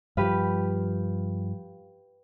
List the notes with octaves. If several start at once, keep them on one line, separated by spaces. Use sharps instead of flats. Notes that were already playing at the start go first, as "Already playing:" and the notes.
G2 F3 G4 B4 F5